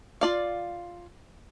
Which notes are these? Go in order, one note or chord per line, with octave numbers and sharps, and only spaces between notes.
F4 D5 F5